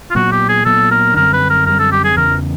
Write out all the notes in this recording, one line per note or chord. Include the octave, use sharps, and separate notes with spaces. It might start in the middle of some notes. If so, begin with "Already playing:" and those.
F4
A#2 F#3 B3 F#4
G4
G#4
A#2 F#3 B3 A4
A#4
F#2 D3 G3 C4 A#4
B4
A#4
F#2 D3 G3 C4 A#4
A4
G4
G#4
E2 C#3 E3 A#4